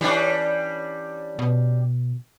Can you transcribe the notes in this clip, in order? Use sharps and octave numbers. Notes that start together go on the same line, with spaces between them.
E3 G3 C#4 D4
B2